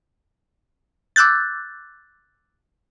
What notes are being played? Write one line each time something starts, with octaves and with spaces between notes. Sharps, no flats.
D6 E6 F#6 G6 A6